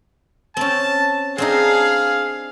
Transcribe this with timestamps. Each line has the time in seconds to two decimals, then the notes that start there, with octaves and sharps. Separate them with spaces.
0.57 C4 C#4 A5
1.38 C4 D4 D#4 G#4 F5